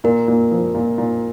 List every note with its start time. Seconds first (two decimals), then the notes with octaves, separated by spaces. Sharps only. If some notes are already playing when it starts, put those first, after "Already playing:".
0.04 A#2 A#4
0.28 A#2
0.51 F3
0.75 A#2
0.98 A#2